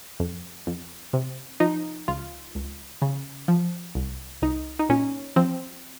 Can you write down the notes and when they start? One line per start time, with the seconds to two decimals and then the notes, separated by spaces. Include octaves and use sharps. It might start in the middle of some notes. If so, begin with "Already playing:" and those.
0.20 F2
0.67 F2
1.13 C3
1.60 F3 D#4
2.08 C#2 F4
2.55 C#2
3.02 C#3
3.48 F3
3.95 C2
4.42 C2 D#4
4.79 D#4
4.89 A#2 C#4
5.36 F3 C4